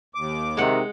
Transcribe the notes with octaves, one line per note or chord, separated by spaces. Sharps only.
D#2 D6
C3 D#3 G#3 F#5